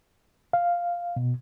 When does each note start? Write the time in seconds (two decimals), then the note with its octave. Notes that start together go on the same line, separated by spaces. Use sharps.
0.53 F5
1.16 B2